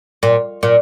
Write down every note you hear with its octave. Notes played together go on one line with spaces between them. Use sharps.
A#2
A#2